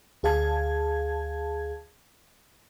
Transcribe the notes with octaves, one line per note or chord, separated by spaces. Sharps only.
D2 G#4 F5 A5 G#6